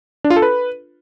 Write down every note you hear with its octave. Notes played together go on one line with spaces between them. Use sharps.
D4
F4
A4
B4